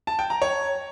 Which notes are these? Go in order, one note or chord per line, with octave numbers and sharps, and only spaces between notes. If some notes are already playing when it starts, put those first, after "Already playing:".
A5
G5
A#5
C#5